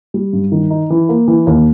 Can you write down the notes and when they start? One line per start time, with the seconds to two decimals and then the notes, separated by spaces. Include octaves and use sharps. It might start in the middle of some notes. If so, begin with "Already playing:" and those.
0.14 G3
0.33 G2
0.52 D#3
0.70 D#4
0.90 E3
1.09 A#3
1.28 E3
1.47 D#2